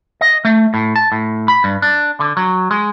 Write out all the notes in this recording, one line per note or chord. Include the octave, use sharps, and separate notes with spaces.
D#5
A3
A2
A5
A2
B5
G2
D4
D3
F#3
G#3